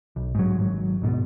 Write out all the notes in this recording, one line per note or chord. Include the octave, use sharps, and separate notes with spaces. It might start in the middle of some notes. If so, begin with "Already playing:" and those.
B1
G#2 F#3
G#1 F#3
D1 G#2 B2 B3